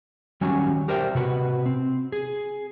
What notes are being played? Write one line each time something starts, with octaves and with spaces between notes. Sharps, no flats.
D#3 F#3 G3 C#4 F#4 G#5
G4 A#4 C5 D5 E5 G5
C3 F#4 B4
C4
G#4